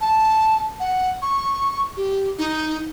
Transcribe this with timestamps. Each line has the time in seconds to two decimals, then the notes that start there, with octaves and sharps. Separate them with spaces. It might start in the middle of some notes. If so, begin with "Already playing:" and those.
0.01 A5
0.80 F#5
1.22 C#6
1.97 G4
2.38 D#4